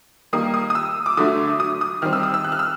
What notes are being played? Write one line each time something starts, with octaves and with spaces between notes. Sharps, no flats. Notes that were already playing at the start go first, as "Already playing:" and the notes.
D#3 G3 A#3 D#6
D#6
D#6
E6
D6
D3 F#3 A3 D#6
D#6
D#6
D#3 G3 C4 F6
E6
D#6
E6
F#6
F6
E6